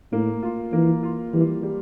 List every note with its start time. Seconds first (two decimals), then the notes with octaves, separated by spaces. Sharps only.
0.12 A2 A#3
0.43 F4
0.73 E3 A#3
1.03 F4
1.33 E3 G3
1.63 G3